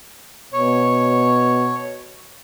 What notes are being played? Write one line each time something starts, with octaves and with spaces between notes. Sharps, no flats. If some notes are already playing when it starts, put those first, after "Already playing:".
B2 C#5